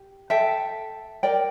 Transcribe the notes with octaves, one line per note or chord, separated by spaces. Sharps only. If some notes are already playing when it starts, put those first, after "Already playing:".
Already playing: G4
A4 E5 G5
A#4 D5 G5